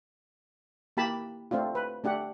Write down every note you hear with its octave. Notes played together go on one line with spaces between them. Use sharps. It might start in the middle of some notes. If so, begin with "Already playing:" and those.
A#3 E4 G4 A5 B5
A3 C4 D4 F4
B4
A3 D4 G4 F#5